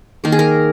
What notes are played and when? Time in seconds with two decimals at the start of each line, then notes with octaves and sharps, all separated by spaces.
0.24 D#3 A#3 A#4
0.32 G#4
0.39 A#4